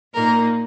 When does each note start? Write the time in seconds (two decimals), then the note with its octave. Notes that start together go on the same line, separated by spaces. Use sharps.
0.14 A#2 A#3 D#4 A#4